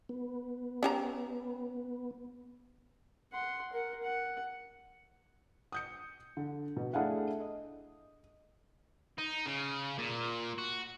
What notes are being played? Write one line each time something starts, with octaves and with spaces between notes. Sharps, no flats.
B3
C#4 G4 A#5
F#5 C6
A#4 F#5
F#5
D#6 G6 C#7
D3
B2
A3 D4 E4 G#4 F5 F#5
D#5
D#4
C#3
A#2
F#4